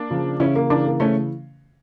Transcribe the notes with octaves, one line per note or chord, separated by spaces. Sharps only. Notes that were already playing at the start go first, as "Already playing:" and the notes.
Already playing: A#3 D4
C#3 F3
C#3 E3 C#4 E4
A#3
C#3 E3 A#3 D4
A#3
C#3 E3 A3 C#4